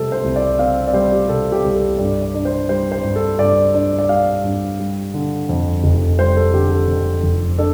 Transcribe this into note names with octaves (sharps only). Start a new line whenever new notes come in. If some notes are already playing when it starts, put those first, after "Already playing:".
Already playing: C3 G3 A4
C5
C2
D5
C4 F5
D5
G3 C5
G4
C3 A4
G4
C2
A4
G2 D5
D5
D4
C5
G3 C5
C5
G2
A4
G2 D5
D4
D5
G3 F5
G2
G3
D3
F2
F1
G3 C5
A4
D3 G4
A4
F2
F1
D4 A4